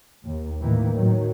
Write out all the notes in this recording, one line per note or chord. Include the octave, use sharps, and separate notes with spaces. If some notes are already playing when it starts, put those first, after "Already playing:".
D#2
A2 D#3 E3 A#3
A2 D#3 F#3